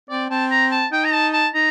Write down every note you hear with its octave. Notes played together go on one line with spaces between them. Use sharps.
C4 D5
C4 A5
A#5
A5
D#4 G5
A#5
A5
A5
D#4 A#5